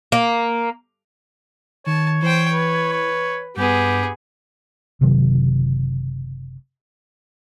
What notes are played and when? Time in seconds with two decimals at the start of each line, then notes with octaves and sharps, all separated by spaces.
0.12 A#3
1.86 D#3 C#5 A5
2.22 E3 C5 G5
2.53 B4
2.93 C#5
3.56 G2 B3 G4 G#4
5.01 F#1 C3 D#3 F#3